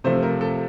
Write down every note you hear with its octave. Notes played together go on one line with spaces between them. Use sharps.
C3 F3 A3 C5
A#4
A4